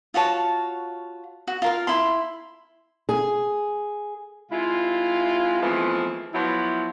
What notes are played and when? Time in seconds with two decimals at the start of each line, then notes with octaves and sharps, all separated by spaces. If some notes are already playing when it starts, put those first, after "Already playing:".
0.14 F4 F#4 C#5 A5
1.47 F#4
1.62 F4 A#4 F5
1.87 E4 B5 C6
3.09 G#4
4.51 C3 G#3 E4 F4
5.61 E3 F3 G#3 A3 B3 C4
6.34 F3 F#3 B3 E4